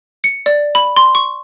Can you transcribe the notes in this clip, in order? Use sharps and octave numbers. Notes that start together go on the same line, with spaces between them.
C#7
D5
B5
C6
C#6